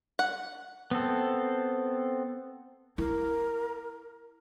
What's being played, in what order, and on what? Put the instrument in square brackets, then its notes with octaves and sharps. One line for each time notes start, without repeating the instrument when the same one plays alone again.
[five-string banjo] F#5
[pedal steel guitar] B3 C4 A4
[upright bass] E4 [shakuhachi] A#4